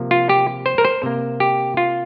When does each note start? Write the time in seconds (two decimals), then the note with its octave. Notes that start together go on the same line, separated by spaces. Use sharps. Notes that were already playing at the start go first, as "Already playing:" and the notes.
Already playing: C3 F3 A#3
0.11 F4
0.29 G4
0.66 C5
0.78 A#4
0.85 C5
1.03 C3 A#3
1.40 G4
1.77 F4